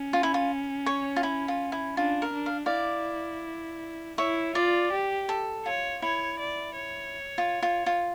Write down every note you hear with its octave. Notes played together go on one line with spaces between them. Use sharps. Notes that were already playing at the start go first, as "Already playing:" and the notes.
Already playing: C#4
F4
E4
F4
C#5
F4
E4
F4
E4
D4 F4
A#4
D4
F5
E4 D5 F5
E4 C#5 E5
F4 D5
G4
A4
F4 C#5
E4 C#5
D5
C#5
F4
F4
F4